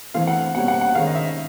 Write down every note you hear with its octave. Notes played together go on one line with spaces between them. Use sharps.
E3 A3 C4 F5
F#5
B2 G3 A#3 C#4 F#5
F#5
F#5
D#3 G#3 C#4 F5
D#5
E5